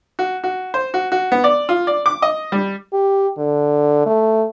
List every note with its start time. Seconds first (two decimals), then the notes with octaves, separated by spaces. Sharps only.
0.19 F#4
0.44 F#4
0.74 C5
0.94 F#4
1.12 F#4
1.32 B3
1.44 D5
1.69 F4
1.87 D5
2.06 D6
2.22 D#5
2.52 G3
2.93 G4
3.38 D3
4.06 A3